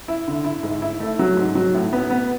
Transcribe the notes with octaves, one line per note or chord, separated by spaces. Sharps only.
E4
D3
E4
G#2
E4
A3
F#3
G#2
F#3
A2
B3
B3